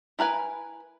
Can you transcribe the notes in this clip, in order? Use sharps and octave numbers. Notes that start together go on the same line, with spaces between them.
E4 A#4 B4 G#5